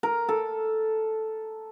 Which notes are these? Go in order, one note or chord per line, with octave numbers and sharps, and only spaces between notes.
A#4
A4